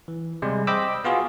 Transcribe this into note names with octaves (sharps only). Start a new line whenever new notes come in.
E3
C3 G3 G#3
C5 D#5 G5 B5 D6 E6
B3 F4 F#4 G#4